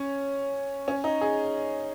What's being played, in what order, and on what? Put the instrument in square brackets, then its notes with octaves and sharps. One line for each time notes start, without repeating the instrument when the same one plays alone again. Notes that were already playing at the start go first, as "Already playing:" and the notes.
Already playing: [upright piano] C#4
C#4
D#4
G#4